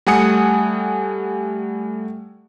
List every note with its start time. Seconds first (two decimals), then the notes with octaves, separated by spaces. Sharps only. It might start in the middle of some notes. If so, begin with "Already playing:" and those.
0.07 G3 A3 F#5 G#5 D#6 C#7